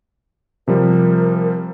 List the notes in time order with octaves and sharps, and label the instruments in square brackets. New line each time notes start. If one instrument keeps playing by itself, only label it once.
[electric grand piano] C3 F3 G3 [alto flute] A#4